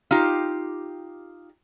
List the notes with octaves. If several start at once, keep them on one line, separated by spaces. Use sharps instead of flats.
D#4 F4 G4 F5